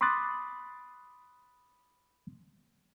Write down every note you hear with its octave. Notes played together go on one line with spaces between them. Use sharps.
B5 C6 D6 D#6 F#6 A6